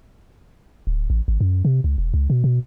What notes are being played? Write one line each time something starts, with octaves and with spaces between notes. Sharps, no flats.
D1
A1
G#1
F#2
C3
C#2
E1
C#2
B2
B2